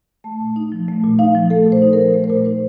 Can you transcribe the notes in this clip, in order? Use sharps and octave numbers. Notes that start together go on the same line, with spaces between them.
A3 A5
A#2
D#4
F3
A3
A#2
D#4 F5
F3
A3 A4
A#2
C5
D#4
A#4
F3
A3 A#4
C5
A#2 A#4
D#4 C5